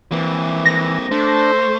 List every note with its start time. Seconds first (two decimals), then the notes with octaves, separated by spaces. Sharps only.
0.12 E3 A#3 C4
0.65 E3 A#6
1.12 A3 D4 C5